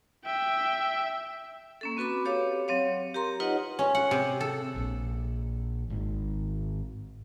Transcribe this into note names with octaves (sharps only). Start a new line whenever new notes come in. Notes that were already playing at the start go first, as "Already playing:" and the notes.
E5 G5
A#3 C#4 A4
C4 F#4 B4 B5 D6
G4 A4 C#5 F5 D6
F#3 C4 C#5 F5
G4 A#4 A#5 C6
D#4 F4 B4 C#5 D#5 F#5
C#4
F#5
C3
A4
A#1
G#1